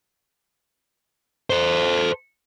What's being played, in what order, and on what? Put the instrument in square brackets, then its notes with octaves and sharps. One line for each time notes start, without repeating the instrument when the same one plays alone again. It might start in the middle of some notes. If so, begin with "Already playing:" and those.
[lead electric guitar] A4 C5